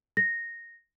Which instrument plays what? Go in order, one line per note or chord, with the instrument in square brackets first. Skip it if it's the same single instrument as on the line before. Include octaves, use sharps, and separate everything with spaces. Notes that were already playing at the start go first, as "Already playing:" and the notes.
[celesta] A#6